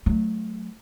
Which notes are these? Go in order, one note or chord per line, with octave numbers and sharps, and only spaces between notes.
F#3 A3